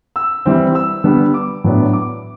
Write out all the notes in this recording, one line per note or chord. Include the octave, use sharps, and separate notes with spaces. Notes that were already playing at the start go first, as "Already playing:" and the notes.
E6
E3 G3 C4
E6
D3 G3 B3
D6
A2 F#3 B3 D4
D6